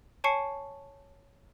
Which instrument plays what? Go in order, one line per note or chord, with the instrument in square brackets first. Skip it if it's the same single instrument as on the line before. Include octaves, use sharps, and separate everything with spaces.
[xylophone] C#5 G#5 A5 C#6 C7 C#7